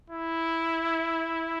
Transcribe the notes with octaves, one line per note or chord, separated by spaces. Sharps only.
E4